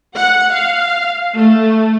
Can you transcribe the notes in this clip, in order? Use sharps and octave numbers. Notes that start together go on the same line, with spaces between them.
F#5
F5
A3